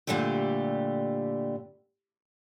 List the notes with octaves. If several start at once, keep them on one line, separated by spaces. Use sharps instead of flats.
A#2 D3 G3 A3 G4